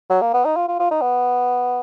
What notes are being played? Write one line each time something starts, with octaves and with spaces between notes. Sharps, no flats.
F#3
A#3
B3
D#4
F4
F4
F4
D#4
B3